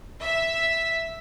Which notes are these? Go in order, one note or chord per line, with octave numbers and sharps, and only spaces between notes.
E5